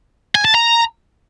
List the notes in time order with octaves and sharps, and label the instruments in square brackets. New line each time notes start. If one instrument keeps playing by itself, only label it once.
[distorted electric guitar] G#5
A5
A#5